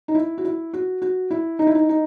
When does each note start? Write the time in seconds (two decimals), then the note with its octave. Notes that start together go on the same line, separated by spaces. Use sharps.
0.08 D#4
0.15 E4
0.38 F#4
0.45 E4
0.73 F#4
1.02 F#4
1.31 E4
1.59 D#4
1.67 E4
1.75 D#4
1.89 D#4